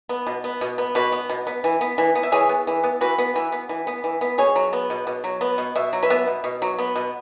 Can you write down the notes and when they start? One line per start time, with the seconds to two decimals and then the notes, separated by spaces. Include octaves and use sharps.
0.09 B3
0.27 B2
0.44 B3
0.61 B2
0.78 B3
0.95 B2 F#4 B4
1.12 B3
1.29 B2
1.47 B3
1.64 E3
1.81 B3
1.98 E3
2.15 B3
2.23 E5
2.32 E3 G#4 C#5
2.49 B3
2.67 E3
2.83 B3
3.01 E3 F#4 B4
3.18 B3
3.35 E3
3.52 B3
3.69 E3
3.87 B3
4.04 E3
4.21 B3
4.38 B2 G#4 C#5
4.56 F#3
4.73 B3
4.90 B2
5.07 B2
5.24 F#3
5.41 B3
5.58 B2
5.76 B2 E5
5.93 F#3
6.03 B4 E5
6.10 B3
6.28 B2
6.44 B2
6.62 F#3
6.79 B3
6.95 B2